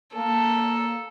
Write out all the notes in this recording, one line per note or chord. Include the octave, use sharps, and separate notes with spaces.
A#3 A4